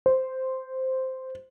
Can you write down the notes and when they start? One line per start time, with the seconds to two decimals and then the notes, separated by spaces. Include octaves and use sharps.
0.06 C5